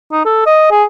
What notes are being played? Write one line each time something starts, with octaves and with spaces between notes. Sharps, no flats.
D#4
A4
D#5
G#4